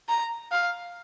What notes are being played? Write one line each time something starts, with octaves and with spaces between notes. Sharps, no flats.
A#5
F5